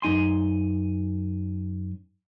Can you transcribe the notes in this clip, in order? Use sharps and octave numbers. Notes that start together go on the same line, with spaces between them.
F#2 D#4 G#5 C6